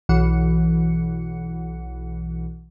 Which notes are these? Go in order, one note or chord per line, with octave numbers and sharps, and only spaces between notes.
B1 E3 F#5 C#7